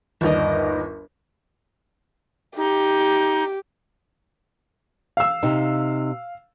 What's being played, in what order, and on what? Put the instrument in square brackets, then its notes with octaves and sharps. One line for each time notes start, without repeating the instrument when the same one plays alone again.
[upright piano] G1 D#2 [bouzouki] D4 A#4 D#5
[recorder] D#4 [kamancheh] G4
[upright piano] F5 E6
[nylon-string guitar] C3 D#4